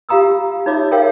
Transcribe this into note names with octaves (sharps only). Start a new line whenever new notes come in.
F4 G4 F5 A#5 D#6 E6
D#4 F4 C#5 D#5 E5 D6
G#4 A#4 C#5 E5 F5 G5